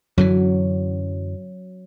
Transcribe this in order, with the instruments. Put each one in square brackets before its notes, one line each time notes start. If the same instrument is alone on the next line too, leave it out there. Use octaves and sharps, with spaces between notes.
[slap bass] F#2 D3 E3 [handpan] F#3